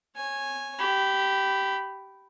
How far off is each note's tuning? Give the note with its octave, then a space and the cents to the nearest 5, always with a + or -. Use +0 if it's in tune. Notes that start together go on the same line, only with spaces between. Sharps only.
C#5 -20 G#5 -5
G4 -15 B5 +5